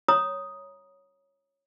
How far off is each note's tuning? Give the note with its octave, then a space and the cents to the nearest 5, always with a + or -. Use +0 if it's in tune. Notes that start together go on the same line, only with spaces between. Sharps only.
C#5 +0 A#5 +20 D#6 +0